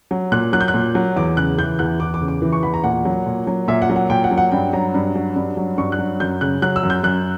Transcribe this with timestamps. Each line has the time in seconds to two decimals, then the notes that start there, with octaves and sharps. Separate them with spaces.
0.11 F#3
0.32 A#2 F#6
0.53 F#3 F#6
0.61 G6
0.68 F#6
0.74 A#2
0.95 F#3
1.16 E2 D6
1.37 C#3 F#6
1.58 E3 G6
1.79 E2 F#6
2.00 E2 D6
2.14 D6
2.21 C#3
2.28 D6
2.42 E3
2.52 C#6
2.63 E2 B5
2.74 A#5
2.84 A#2 F#5
3.05 F#3
3.26 A#2
3.47 F#3
3.68 A#2 E5
3.82 F#5
3.89 F#3
3.96 F#5
4.10 A#2 G5
4.24 F#5
4.31 F#3
4.37 F#5
4.52 G2 G5
4.73 F#3 A#5
4.94 G2
5.15 F#3
5.36 G2
5.57 F#3
5.78 G2 C#6
5.92 F#6
5.99 F#3
6.20 F#2 G6
6.41 C#3 F#6
6.62 F#3 F#6
6.76 E6
6.83 F#2
6.90 G6
7.03 F#2 F#6